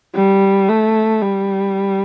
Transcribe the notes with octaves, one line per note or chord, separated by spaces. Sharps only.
G3
A3
G3